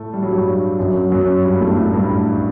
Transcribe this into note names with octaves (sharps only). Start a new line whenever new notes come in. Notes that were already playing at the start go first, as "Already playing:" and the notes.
Already playing: A2 A3
G3
F#3
G2 G3
F#2 F#3
F#2 F#3
G2 G3
A2 A3
A2 A3
G2 G3